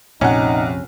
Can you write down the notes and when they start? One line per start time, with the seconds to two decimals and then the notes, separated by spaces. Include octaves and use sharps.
0.21 A#1 F2 C3 C#4 D#4 F#5